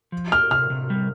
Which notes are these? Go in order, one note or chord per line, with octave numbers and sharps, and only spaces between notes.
F3
G4 F6
C3 F6
C3
G3